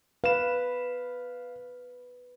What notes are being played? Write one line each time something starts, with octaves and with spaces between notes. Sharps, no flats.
B4 F5 E7